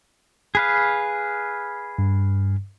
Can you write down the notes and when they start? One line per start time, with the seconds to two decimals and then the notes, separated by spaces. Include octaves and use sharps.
0.55 G#4 B4 F5
1.99 G2